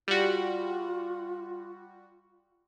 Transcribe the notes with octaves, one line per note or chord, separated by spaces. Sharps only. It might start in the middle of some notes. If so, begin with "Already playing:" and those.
G3 F4 F#4